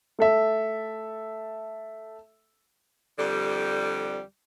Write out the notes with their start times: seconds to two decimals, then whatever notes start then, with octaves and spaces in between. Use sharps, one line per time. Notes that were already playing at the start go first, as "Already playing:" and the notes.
0.19 A3 A4 E5
3.19 F2 D3 G3